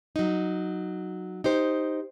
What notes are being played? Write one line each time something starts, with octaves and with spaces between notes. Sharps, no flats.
F#3 D#4
D#4 G4 C5